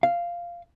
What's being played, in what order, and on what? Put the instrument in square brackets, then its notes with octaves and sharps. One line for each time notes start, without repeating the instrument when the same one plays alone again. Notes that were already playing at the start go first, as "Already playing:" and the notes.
[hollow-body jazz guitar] F5